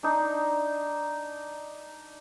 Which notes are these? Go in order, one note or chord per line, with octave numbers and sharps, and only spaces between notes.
D4 D#4